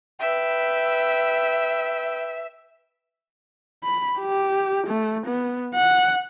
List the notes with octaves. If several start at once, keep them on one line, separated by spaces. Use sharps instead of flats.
B4 E5 G5
B5
G4
A3
B3
F#5